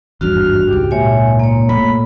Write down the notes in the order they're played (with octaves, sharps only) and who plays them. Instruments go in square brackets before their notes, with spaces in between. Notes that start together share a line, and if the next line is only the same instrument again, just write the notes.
[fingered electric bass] G#1 E2 G2 [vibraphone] F#4 [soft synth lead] F6
[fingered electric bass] C#2 G#2 [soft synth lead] G4
[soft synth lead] A#2 [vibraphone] C#5 E5 G#5
[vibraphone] A#3 C#5
[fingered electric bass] A#2 A3 [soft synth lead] B5